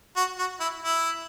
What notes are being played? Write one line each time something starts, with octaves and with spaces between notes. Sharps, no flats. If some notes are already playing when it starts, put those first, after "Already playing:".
F#4
F#4
E4
E4